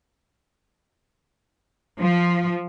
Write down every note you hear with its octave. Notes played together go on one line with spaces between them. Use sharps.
F3